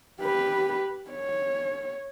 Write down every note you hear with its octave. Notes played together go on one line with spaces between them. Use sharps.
G4 B4
C#5